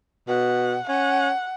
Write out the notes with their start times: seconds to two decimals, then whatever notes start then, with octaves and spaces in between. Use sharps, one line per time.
0.28 B2 F#5
0.89 C#4 F#5